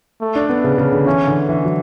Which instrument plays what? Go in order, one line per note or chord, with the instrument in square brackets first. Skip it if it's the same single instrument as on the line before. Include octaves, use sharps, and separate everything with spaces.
[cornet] A3
[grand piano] D4
B3
C#3
C#3
D3
[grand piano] E3 [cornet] C#4
[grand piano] D3
E3
F#3